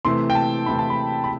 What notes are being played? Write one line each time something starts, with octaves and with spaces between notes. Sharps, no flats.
C3 E3 A3 C6
G5
A5
C3 E3 A3 B5
A5
B5
B5